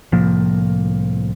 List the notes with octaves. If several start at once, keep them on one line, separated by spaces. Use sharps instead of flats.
C2 A2 F3 A#3